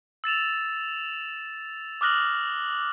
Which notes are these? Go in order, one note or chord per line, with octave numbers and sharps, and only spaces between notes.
E6 A6 E7 F7
D6 D#6 F6 F#6 A#6 F#7